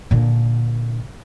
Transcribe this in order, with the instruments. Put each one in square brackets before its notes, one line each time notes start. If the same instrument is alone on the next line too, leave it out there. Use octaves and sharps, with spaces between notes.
[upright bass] A#2 D3